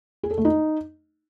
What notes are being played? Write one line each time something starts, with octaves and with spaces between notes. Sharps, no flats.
G#4
A4
A3
D#4